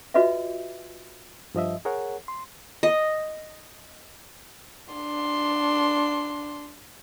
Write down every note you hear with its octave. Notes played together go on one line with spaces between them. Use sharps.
F4 F#4 B4 D#5 E5
G2 F3 D#5 E5
G#4 A#4 C#5 F#5
C6
D#5
D4 C6